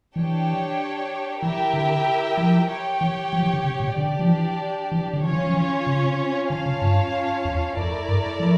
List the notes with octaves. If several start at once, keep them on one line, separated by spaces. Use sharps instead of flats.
E3 D4 G4 C#5 G5
E3 E4 G4 A#4 E5 G5
D3
F3
G4 C#5 G5
E3
F3
E3
D3
C#3
A#2
D3 D4 G4 D5
F3
E3
E3
D3
E3 C#4 F4 C#5
E3
F3
E3
C#3
D3 C#4 F4 C#5 F5 A5
C#3
G2
E2
F2 A3 E4 A#4 D5
G2
F3